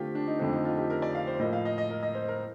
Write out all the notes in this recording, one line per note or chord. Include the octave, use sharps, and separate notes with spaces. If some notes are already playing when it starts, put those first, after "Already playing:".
Already playing: D3 A3 C4 F4 G4
D4
D#4
F2 D3 A3 C4 D4
D#4
F4
G4
A#4
D5
F5
C5
A2 F3 A#3 D#5
F5
D#5
D#5
A#4
D#5
C5
A#4